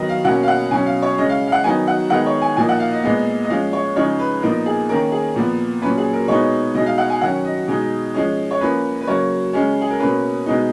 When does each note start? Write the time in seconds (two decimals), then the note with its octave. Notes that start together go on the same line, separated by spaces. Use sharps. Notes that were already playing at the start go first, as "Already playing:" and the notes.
Already playing: D#3 F#3 B3 D#5
0.09 F5
0.24 B2 A#3 C#4 F#5
0.43 F5
0.48 F#5
0.71 B2 F#3 C#4 G#5
0.86 F5
1.02 C#5
1.18 C#3 G#3 C#4 D#5
1.29 F5
1.47 F5
1.52 F#5
1.64 D#3 F#3 B3 D#4 G#5
1.87 F#5
2.10 D#3 G#3 B3 D#4 F#5
2.26 C#5
2.42 G#5
2.57 A#2 F3 A#3 D#4 G#5
2.69 F#5
2.80 F5
2.92 D#5
3.03 A#2 G#3 B3 D#5
3.44 D#5
3.50 F3 G#3 C#4 F5
3.73 C#5
3.96 C#3 F3 G#3 D#4 C#5
4.19 B4
4.43 A#2 F3 B3 D#4 A#4
4.66 G#4
4.89 D#3 A#3 C#4 A#4
5.12 G#4
5.36 A#2 F3 B3
5.82 A#2 F#3 C#4 B4
5.98 G#4
6.13 A#4
6.28 B2 G#3 B3 D#4 C#5
6.75 B2 G#3 D#4 D#5
6.86 F5
6.98 F#5
7.10 G#5
7.21 D#3 F#3 C#4 F#5
7.45 D#5
7.68 B2 G#3 D#4
8.14 F3 G#3 C#4
8.51 C#5
8.61 F3 A#3 C#4 B4
9.01 B4
9.07 C#3 F#3 A#3 C#5
9.53 C#3 G#3 C#4
9.81 G#4
9.90 A#4
9.99 B2 A#3 C#4 B4
10.46 B2 G#3 B3 D#4